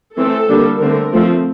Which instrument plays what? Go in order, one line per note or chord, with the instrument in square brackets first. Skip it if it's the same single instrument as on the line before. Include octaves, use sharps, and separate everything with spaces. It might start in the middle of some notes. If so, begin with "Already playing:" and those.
[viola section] E3 A3 C4 A4
D3 G3 A#3 D4
D3 A3 C4 A#4
F3 A3 C4